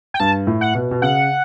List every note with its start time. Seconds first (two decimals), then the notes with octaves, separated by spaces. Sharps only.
0.14 G5
0.20 G2 A5
0.47 A2
0.61 F#5
0.75 B2
0.91 B2
1.02 C#3 F#5